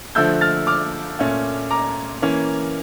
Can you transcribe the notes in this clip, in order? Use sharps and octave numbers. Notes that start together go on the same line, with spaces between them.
D3 F3 A3 E6 G6
F6 A6
D6 F6
A#2 A3 C#4
A#5 D6
E3 A#3 C#4